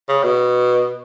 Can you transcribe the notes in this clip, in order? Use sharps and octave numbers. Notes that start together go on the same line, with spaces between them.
C#3
B2